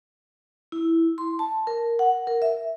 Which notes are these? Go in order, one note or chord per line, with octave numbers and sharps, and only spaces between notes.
E4
C6
A5
A#4
F#5
A#4
E5